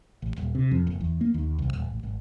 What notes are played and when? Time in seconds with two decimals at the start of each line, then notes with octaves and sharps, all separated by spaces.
0.22 A1
0.38 D#1
0.55 C3
0.71 F2
0.87 F#1
1.01 E2
1.21 A#3
1.34 D#2
1.59 C2
1.73 D#1
1.90 A1
2.03 G#1